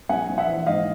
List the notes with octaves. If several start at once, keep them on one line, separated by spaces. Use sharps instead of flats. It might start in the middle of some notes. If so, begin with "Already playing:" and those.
A#1 F#5 G#5
A#1
E5 F#5
E3
G#2 D#5 F5